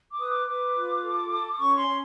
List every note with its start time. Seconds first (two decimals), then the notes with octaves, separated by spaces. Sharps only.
0.11 D6
0.19 B4 D#6
0.29 D6
0.47 B4 D6
0.75 F4
1.03 A4
1.30 A4
1.58 C#4 C#6
1.77 C6
1.86 C#4